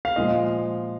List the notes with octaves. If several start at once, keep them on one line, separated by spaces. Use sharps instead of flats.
F5
A#2 F3 G#3 D#5